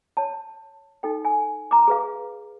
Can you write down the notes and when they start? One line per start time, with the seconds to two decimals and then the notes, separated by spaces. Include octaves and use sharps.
0.17 C#5 A5
1.03 D#4 A4 G5
1.25 G#5
1.71 A#5 D6
1.88 G#4 B4 F5